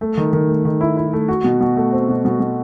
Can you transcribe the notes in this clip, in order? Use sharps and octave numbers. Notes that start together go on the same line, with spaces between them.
A3
D#3
D#3
A3
D#3
E4
E4
A3
F#4
B2
B2
A3
C4
B2
B2
B2